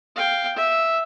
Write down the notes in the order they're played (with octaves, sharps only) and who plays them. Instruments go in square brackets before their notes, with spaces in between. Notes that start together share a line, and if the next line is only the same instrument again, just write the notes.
[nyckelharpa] F5 G5
E5